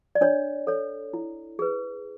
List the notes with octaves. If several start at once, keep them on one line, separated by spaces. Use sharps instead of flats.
D5
D4 C#5
A4 C#5
E4
G#4 B4